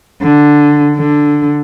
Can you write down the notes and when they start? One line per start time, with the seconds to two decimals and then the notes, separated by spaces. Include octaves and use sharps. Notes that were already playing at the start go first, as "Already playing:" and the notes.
0.22 D3
0.97 D3